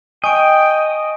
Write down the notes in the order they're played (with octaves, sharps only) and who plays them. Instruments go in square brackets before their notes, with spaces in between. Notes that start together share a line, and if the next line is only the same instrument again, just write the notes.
[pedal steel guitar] D#5 [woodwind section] G5 [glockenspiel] G#5 C#6 D7